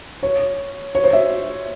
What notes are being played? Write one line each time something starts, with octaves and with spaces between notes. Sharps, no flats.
C#5
C#5
C5
E5